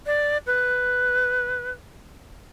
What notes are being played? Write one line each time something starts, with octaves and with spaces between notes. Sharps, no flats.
D5
B4